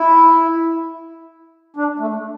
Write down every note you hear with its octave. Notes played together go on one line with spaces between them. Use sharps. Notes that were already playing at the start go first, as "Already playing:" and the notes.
Already playing: E4
D4
A3